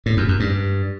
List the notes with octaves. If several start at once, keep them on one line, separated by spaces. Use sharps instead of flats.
A2
F#2
F#2
G2